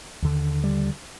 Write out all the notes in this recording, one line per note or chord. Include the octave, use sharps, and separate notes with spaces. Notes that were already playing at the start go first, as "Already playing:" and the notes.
D#2 D3
G3